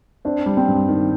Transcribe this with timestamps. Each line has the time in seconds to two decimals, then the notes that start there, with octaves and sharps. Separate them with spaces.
0.25 C4 D4
0.46 G3
0.57 C4
0.68 G2
0.89 D#3